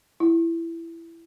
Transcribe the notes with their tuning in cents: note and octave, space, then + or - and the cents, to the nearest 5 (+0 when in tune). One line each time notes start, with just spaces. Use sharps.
E4 +15